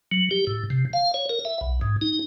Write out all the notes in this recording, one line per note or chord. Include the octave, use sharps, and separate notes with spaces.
F#3
G4
A2
C3
F5
C#5
A#4
E5
B1
G#2
D#4